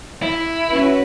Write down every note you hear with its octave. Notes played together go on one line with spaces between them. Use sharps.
E4
C#4 F#4 B4